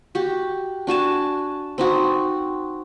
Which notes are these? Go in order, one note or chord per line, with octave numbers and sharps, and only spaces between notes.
F#4 G4
D4 F#4 G#5 A5
C4 D#4 F#4